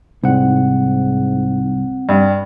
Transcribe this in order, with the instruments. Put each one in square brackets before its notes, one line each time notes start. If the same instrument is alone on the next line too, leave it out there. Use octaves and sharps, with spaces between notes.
[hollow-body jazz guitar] C2 [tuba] G#2 [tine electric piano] C4 F#5
[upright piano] G2